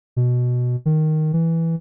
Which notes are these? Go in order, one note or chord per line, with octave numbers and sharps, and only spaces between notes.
B2
D#3
E3